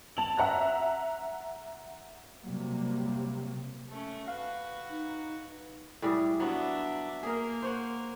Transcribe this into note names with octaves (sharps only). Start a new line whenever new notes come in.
A5 F7 F#7
E5 F#5 A#5 F#6
C3 F#3 G3 A#3
A3 C#4
F#4 B4 F5
D#4
A2 G3 G#4
F#3 B3 D4 C#5 E5
A#3 G#4 A#4
C5 C#5 F#5